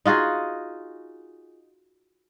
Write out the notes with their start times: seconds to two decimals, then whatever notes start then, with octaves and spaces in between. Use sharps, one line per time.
0.06 D#4 F4 F#4 G#4